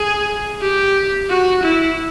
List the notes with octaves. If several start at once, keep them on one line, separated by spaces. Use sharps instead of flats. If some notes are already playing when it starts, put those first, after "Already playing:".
Already playing: G#4
G4
F#4
E4